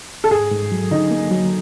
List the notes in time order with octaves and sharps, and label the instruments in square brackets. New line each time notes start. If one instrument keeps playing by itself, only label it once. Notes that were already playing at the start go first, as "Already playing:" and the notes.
[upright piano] A4
[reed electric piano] G#2 [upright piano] G#4
[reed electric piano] G#2
F#3
[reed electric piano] D3 [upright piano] D#4
[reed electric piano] A#3
F#3